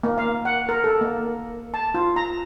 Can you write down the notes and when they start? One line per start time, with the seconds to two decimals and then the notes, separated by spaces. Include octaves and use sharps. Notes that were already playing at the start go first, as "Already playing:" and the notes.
0.03 A#3
0.18 F5
0.45 F#5
0.69 A#4
0.84 A4
1.01 A#3
1.74 A5
1.95 F4
2.16 A#5